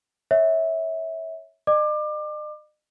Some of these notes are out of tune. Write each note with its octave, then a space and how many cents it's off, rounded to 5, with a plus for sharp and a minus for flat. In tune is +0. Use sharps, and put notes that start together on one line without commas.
C#5 +0 E5 -20
D#5 -45 D6 +25